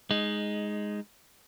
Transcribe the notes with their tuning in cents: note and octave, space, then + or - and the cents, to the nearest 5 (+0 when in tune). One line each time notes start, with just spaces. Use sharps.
G#3 +0 D#4 +0